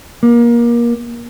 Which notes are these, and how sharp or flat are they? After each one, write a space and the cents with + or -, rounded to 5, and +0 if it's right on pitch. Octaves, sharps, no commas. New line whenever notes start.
A#3 +25